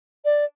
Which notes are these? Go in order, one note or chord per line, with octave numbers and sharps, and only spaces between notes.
D5